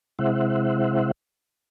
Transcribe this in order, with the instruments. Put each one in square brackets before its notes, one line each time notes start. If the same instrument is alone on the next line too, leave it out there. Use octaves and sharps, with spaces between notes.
[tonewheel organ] C3 G#3 E4 C5 E5 F#5